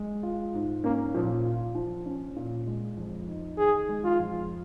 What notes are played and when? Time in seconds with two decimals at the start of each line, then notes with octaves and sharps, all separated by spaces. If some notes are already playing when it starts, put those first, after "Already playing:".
Already playing: G#3
0.23 F4
0.54 G#2
0.84 A#3 C#4
1.14 A#2 F3
1.45 F4
1.75 F3
2.06 C#4
2.36 A#2
2.67 G#3
2.97 F2
3.27 D#4
3.58 D#3 G#4
3.89 G#3
4.04 F4
4.20 F2